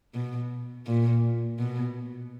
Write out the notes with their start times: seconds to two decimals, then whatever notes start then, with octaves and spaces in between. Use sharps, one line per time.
0.15 B2
0.86 A#2
1.59 B2